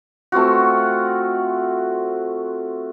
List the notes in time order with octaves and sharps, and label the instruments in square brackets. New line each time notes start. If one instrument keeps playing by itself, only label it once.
[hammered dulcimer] A3 C4 F4 F#4